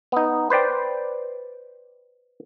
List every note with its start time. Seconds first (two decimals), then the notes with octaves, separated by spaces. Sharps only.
0.12 B3 D#4
0.50 B4 C5 D5 G5